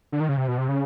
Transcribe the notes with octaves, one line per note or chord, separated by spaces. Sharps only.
D3
D#3
C#3
C3
B2
C3
C#3